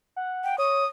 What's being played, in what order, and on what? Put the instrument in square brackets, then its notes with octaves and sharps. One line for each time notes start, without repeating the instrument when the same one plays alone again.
[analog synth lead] F#5
[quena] G5
[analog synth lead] C#5 [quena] D#6